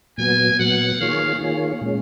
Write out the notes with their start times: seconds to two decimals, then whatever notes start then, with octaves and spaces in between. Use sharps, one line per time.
0.18 A#2 F#3 B3 G#5
0.59 A#2 F#3 B3 F#5
1.00 D#3 A#3 F4 G#4 C#5 F5
1.40 D#3 A#3 F4 G#4 C#5
1.81 A#2 G#3 C#4